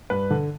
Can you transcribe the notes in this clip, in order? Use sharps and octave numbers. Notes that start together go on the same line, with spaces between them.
G2 B4
D3